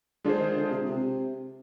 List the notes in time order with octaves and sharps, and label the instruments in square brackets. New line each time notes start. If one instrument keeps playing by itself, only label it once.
[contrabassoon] D3 [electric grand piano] G#3 D4 F4 G#4 C5
[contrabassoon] D#3
D3
C3
C3